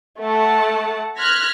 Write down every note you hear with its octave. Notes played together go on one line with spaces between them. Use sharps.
A3 F#5 A5
C6 F6 F#6 G#6 A#6 B6